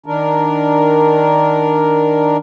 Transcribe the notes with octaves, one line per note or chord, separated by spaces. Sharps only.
D#3 D4 A#4